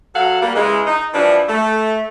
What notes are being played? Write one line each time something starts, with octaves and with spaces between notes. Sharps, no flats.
F#3 A4 F5 F#5
G3 A#3
C#3 E3 G#3
D#4
E3 F3 G3 D4
A3